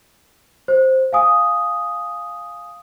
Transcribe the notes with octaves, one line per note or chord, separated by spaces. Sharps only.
C5
F5 G#5 D#6